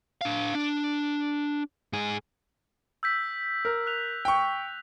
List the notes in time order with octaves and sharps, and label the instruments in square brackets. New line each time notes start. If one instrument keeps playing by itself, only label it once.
[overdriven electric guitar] D4 F5
D4
G#2 G#4
[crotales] E6 G6 B6
[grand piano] A#4
[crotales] F#6 F7
[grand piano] G5 C#6